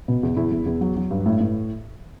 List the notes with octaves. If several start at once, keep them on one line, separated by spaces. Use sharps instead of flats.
B2
E2
E2 E4
E2
E2
F#3
F#3
G2
A2
A2